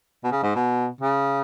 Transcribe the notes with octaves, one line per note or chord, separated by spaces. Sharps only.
B2
C#3
G#2
B2
C#3